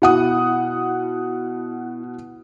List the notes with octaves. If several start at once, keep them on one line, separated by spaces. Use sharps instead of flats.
B2 E4 F#5 D#6